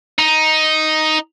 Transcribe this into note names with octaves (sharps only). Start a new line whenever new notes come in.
D#4